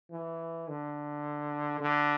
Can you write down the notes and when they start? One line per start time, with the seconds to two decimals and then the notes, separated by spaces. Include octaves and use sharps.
0.11 E3
0.68 D3
1.80 D3